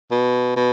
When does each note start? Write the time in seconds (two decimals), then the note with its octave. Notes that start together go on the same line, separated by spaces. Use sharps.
0.11 B2
0.56 B2